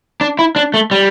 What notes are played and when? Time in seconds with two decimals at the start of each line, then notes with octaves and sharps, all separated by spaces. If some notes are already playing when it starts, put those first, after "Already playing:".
0.21 D4
0.39 E4
0.56 D4
0.74 A3
0.91 G3